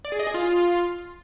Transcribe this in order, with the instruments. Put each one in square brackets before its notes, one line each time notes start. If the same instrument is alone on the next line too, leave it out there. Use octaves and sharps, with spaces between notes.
[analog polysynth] D5
G#4
D#5
G#4
F4